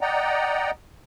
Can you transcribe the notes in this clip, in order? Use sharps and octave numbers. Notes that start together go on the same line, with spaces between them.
D5 D#5 F#5 G5 A#5